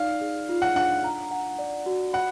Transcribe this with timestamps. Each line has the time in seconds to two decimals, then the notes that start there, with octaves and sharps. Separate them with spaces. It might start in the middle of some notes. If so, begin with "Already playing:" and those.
Already playing: D#4 D5 F5
0.21 G#4
0.49 F4
0.62 F#5
0.76 D4 F#5
1.04 A#5
1.31 F#5
1.59 D5
1.86 F#4
2.13 F#5 B5